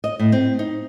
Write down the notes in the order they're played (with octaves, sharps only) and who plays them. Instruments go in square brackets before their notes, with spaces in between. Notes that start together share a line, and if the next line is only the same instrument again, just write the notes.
[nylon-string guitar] D#5
A2
C4
D#4